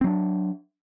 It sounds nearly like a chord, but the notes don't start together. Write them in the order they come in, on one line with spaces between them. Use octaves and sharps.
C4 F#3 D4